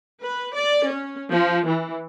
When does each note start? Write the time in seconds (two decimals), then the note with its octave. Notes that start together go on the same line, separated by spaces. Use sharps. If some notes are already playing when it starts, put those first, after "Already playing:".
0.21 B4
0.54 D5
0.89 C#4
1.32 F3
1.68 E3